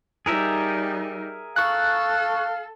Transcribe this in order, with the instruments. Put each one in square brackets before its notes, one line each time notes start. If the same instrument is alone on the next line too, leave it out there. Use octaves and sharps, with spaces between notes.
[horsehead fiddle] G3 D#4 [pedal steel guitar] G#4 A#4 E5
[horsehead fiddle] A4 [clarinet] F5 [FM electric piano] C#6 F#6